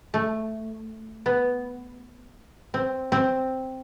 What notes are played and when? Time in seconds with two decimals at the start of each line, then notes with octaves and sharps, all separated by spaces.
0.14 A3
1.26 B3
2.74 C4
3.12 C4